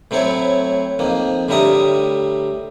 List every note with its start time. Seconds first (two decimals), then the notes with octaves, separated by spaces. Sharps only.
0.11 A2 F#3 C4 E4 C#5
0.99 F2 D#3 A#3
1.49 A2 D3 G3 A#4 E5 D#6